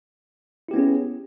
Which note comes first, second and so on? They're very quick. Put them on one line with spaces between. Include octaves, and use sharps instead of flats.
E4 G4 B3 C#4 G#4